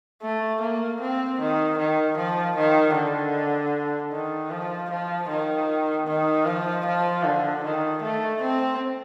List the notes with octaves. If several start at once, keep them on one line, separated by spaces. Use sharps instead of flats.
A3
A#3
C4
D#3
D#3
F3
D#3
D3
D#3
F3
F3
D#3
D#3
F3
F3
D3
D#3
A3
C4